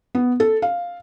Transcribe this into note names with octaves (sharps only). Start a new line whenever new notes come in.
B3
A4
F5